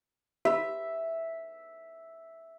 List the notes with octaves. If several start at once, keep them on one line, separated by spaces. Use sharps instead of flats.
G4 E5 B5